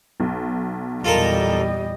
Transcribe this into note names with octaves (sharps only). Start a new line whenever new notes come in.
B1
E2 A#2 G3 F4 A4 A#4 D#5